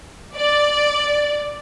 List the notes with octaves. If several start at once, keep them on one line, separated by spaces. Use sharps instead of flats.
D5